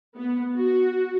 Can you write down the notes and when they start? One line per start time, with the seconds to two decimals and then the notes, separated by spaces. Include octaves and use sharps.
0.16 B3
0.56 F#4